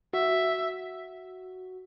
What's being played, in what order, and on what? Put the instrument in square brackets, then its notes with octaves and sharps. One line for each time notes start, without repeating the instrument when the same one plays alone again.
[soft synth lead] F#4 [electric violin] E5